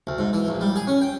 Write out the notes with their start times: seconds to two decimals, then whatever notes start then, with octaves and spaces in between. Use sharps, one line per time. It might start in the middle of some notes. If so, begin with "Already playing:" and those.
0.07 D2
0.18 G#2
0.33 E3
0.48 A#1
0.61 G3
0.76 G#4
0.87 C#4
1.01 G5